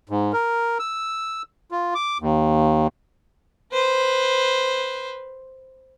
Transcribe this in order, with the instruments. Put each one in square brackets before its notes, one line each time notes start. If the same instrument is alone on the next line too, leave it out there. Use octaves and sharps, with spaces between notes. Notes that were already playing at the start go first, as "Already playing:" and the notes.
[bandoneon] G#2
A#4
E6
F4
D6
D#2
[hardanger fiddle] B4 C5